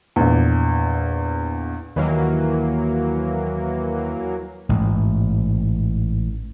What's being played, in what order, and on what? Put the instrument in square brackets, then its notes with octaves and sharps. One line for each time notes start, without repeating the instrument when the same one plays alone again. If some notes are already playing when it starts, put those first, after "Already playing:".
[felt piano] A#1 E2
[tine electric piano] D#2 [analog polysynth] E3 F#3 A#3
[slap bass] A1 G#2